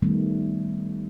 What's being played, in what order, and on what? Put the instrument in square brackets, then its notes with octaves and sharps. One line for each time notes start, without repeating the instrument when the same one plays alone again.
[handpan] D#3 G3 A3 B3